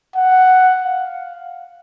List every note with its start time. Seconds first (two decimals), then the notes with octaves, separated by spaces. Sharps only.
0.16 F#5
0.84 F5